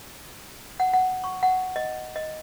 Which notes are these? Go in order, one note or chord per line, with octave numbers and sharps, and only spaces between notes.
F#5
F#5
C#6
F#5
D#5
D#5